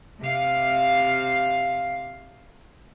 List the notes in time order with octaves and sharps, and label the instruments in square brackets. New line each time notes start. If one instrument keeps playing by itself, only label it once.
[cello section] C3 F5